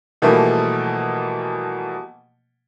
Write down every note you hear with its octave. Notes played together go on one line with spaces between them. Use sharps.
B2 E3 F3 G3 A3 A#3